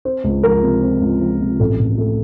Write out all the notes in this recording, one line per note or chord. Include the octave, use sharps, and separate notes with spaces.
C4 C5
C#2
F3 A#4
C3
C4
C#2
F3
C3
A1 A4
A1
A3